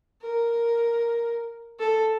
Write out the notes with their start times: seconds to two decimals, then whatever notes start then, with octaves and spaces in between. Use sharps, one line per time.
0.22 A#4
1.79 A4